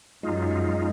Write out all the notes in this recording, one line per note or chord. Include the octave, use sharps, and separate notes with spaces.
F#2 G#3 D#4 F4